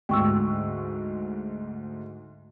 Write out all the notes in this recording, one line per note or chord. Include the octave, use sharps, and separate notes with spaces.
D2 G#2 G5 C#6 E6